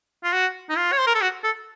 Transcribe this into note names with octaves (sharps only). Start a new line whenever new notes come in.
F4
F#4
D#4
F4
C#5
C5
A#4
A4
F#4
A4